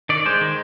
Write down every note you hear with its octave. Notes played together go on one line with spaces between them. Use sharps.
D#3 D5
G#3 C5
D#3